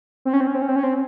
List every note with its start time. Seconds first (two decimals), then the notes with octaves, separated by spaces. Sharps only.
0.25 C4
0.33 C#4
0.40 C4
0.47 C#4
0.55 C4
0.62 C#4
0.69 C4
0.76 C#4
0.83 C4